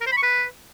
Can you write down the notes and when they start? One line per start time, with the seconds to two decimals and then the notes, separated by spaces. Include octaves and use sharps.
0.01 A#4
0.07 C5
0.12 B5
0.17 C#6
0.23 B4